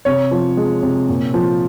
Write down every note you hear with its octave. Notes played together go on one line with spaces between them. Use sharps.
C3 C#5
F3
G#3
C3
A#2
F3